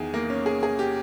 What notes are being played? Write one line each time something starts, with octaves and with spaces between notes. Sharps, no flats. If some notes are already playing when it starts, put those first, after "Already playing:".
Already playing: E2 D#3 G#4
A#3
C#4
G#4
G#4
G4